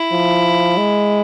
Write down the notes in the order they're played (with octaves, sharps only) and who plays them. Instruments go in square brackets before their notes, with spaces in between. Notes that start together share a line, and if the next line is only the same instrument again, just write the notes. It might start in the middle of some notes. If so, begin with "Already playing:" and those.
Already playing: [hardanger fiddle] E4
[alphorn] F3
G#3